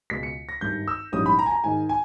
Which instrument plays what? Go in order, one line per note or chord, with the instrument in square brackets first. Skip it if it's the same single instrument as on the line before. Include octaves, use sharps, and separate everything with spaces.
[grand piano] C#2 B2 G#3 B6
C#7
A#6
G#1 G2 D#3 G6
E6
A#1 G#2 E3 G3 C#4 D#6
B5
A#5
G#5
A#5
G#2 D#3 G#3 G#5
G#5